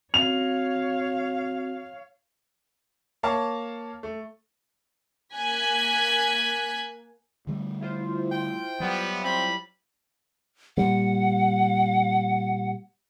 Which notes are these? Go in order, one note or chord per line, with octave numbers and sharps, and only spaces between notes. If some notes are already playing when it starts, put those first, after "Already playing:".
C4 F#4 C#5 F5 F7
A#3 C#5 F5 A5
A3
A#3 G#5 F#6 G#6 B6
D3 G3 A3
E4 F4 C5
G5
F#3 G3 B3
G3 C4 B5
A#2 G3 F#5